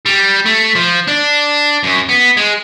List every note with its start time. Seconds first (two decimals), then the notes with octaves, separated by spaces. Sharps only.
0.06 G3
0.45 A3
0.75 F3
1.08 D4
1.84 F#2
2.09 B3
2.37 G#3